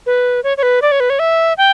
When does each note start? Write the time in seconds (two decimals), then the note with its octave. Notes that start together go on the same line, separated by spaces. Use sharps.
0.06 B4
0.44 C#5
0.57 C#5
0.63 B4
0.82 D5
0.92 C#5
1.00 B4
1.10 C#5
1.19 E5
1.58 G5